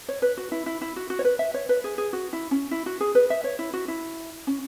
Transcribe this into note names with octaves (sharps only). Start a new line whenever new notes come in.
C#5
B4
F#4
E4
E4
E4
F#4
F#4
C#5
B4
E5
C#5
B4
G#4
G#4
F#4
E4
C#4
E4
F#4
G#4
B4
E5
C#5
E4
F#4
E4
C#4